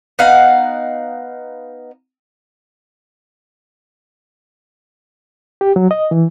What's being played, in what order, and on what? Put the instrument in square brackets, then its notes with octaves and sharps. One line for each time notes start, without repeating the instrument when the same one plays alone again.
[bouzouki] B3 D#4 F5 F#5
[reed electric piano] G4
F#3
D#5
E3